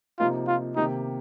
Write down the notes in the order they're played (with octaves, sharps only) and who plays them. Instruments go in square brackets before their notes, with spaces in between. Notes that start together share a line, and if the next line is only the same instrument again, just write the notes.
[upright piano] C3 F3 A#3 D#4 [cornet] F4
[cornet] F4
[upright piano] C3 D#3 A#3 G4 [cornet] D#4